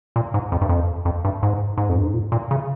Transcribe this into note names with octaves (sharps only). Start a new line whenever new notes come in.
A#2
G#2
F2
G2
F2
F2
G2
G#2
G#2
F2
G2
G#2
A#2
A#2
C#3